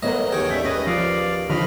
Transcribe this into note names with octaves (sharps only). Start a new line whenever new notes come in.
F#3 A3 B3 F#4 A#4 D#5
D#2 G#4 C#5 G5
C#4 A4 D5 E5
C#4 B4 D#5
F3 D5 F5
D3 D#3 F3 D#5 B5 F6